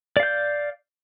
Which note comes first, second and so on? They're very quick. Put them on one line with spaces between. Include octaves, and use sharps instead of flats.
D5 F5 G6